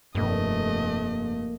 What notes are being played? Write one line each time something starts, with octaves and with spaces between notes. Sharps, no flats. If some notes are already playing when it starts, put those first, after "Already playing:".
F1 G2 A3 A#3 D#5